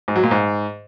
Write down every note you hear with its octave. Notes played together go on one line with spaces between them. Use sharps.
G#2
F#3
A#2
G#2